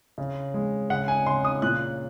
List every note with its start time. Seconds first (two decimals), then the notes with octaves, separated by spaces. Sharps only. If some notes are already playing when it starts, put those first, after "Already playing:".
0.18 C#3
0.54 G#3
0.90 C#3 F#5
1.08 G#5
1.26 C#3 C6
1.45 D#6
1.62 A#2 F#6